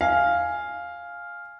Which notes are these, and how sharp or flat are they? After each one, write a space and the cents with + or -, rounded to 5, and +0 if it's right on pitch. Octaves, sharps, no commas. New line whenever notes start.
F5 +0 G#5 +0